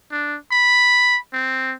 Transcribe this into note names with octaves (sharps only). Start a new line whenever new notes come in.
D4
B5
C4